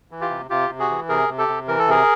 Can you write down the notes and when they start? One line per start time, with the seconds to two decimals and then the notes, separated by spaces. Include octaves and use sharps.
0.11 E3
0.21 F4 G4
0.30 C3
0.50 C3 F4 G4
0.70 C3
0.79 F#4 G#4
0.90 E3
1.09 C3 G#4 A#4
1.29 C3
1.38 G4 A4
1.49 C3
1.68 E3 A#4
1.79 A4
1.88 C3 G#4 A#4